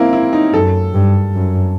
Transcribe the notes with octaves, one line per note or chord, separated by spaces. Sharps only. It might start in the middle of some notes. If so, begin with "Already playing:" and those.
Already playing: A#3 C4 E4
E4
D#4
F#2 A4
G2
F#2